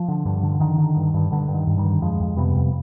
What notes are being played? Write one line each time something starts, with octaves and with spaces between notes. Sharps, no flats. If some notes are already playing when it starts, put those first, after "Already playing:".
Already playing: F3
D3
G2
D3
D3 D#3
D3
G2
G2
G2 D3
G2
D#3
G2
D#3 G3
D3
F2 F3 G#3
F2
C3 G3 B3
F2